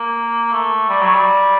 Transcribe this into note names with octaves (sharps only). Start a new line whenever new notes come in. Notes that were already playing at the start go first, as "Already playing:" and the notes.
Already playing: A#3
A3
G3
F#3
G3